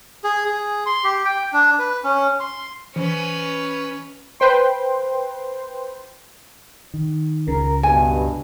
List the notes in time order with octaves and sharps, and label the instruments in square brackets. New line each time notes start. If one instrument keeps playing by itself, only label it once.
[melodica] G#4
G#4
C6
G4
G5
D4
B4
C#4
C6
[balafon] E3 [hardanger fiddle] C#4 B4
[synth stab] B4 C5 G5 C6
[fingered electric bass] D#3
[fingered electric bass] C#2 [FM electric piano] C#3 [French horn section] A#4
[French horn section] G2 B2 [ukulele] G#5